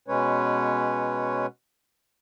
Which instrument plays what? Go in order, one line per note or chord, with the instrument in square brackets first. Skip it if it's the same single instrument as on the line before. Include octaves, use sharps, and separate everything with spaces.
[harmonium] B2 G#3 C#4 B4 C#5